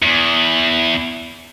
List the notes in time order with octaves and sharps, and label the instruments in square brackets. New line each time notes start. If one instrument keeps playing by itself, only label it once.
[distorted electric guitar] E2